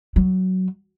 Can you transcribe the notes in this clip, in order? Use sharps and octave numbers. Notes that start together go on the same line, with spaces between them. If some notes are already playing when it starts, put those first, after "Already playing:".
F#3